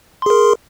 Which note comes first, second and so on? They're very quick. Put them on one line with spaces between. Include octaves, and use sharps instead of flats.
C6 G#4 A#4